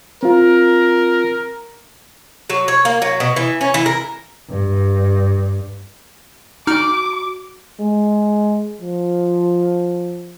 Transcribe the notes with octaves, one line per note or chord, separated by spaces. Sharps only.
C4 F4 A#4
F#3
C#5
A#3
F#3
B2
E3
C#4
E3
A#4
G2
D#4 F#4 D5 D6 F6
G#3
F3